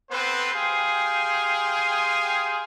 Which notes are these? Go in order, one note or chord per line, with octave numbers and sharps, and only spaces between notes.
B3 C4 A4 B4 C5
G4 G#4 F5 G5 G#5 C6